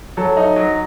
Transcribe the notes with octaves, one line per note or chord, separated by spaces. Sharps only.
F#3 A4
D#4
F#3